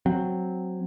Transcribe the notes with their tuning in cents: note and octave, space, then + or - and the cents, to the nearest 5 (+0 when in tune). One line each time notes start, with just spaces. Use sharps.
F#3 +0 C4 +0